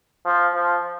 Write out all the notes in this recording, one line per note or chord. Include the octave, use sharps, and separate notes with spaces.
F3
F3